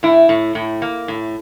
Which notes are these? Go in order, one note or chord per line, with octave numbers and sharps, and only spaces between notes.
A2 E4
A2
A2
A#3
A2